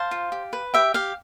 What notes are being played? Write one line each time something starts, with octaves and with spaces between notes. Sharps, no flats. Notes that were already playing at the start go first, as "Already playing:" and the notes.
Already playing: C5 F5 A5
F4
G4
B4
G4 E5 G5
G4 F5